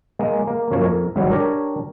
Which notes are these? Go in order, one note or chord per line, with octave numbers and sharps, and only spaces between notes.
G#3 A#3
A#3
F#2 F3 A#3 C#5
F2 A#4
G#1 G#2 F#3 G3
D4 G4 A#4 C#5